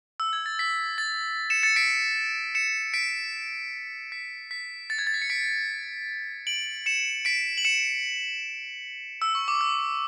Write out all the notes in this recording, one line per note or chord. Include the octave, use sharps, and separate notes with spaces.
E6
G#6
A6
B6
A6
C#7 E7
A6 C#7
B6 D7
C#7 E7
B6 D7
B6
B6
A6 C#7
G#6
A6
B6
C#7
B6 D7
D7 F#7
C#7 E7
B6 D7
F#7
C#7 E7
E6
C#6
D6
E6